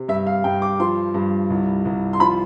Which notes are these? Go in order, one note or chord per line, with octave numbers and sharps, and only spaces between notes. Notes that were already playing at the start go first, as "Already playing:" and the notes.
Already playing: C3
G2 E5
F5
G2 G5
D6
F3 C6
G2
C2
C2
C6
F3 B5